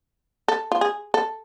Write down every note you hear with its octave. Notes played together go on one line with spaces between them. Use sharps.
A4
F4
G#4
A4